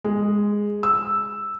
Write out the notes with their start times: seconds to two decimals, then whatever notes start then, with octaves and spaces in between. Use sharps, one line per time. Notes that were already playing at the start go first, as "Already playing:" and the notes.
0.04 G#3
0.83 E6